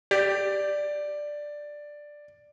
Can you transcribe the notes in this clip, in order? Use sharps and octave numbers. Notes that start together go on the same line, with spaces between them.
G4 D5